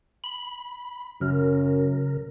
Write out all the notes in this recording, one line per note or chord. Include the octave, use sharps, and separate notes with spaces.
B5
F#2 C#3 A#4